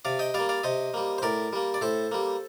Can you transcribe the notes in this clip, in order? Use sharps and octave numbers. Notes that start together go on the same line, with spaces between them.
C3 D5 F5
D#5 G5
G3 A#3 D5 F5
D5 F5
C3 C5 D#5
G3 A#3
C5
A2 A#4 D5
G3 A#3
D5
A2 A4 C5
G3 A#3